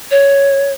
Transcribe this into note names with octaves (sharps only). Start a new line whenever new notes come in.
C#5